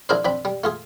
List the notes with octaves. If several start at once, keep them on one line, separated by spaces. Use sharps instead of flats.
F3 D4 E4 G#4 A#4 C5
F3 C4 D4 B5
G3
A3 F4 G#4